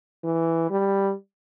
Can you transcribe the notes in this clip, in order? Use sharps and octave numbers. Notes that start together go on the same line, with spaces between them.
E3
G3